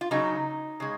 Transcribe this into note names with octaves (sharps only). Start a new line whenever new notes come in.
F4
C#3 F#3 D#4
C#3 G#3